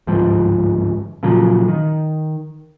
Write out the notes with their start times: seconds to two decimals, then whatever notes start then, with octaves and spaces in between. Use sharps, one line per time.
0.07 G1 C#2 G#2 F3
1.23 A#2 C#3 F3 F#3
1.68 D#3